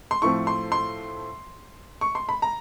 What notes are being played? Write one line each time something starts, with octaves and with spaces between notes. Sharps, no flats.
C6
A2 F3 A3 C4 C#6
C6
C6
C#6
C6
B5
A#5